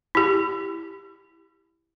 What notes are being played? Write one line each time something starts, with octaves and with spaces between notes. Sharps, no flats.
E4 G4